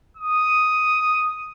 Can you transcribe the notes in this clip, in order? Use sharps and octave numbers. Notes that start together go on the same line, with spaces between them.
D#6